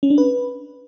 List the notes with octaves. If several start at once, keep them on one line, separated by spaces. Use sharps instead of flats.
C#4
D4
B4